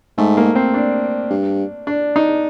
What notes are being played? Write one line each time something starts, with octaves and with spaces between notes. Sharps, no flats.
G#2 A3
A#3
C4
D4
G2
D4
D#4